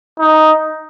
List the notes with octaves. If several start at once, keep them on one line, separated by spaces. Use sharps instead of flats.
D#4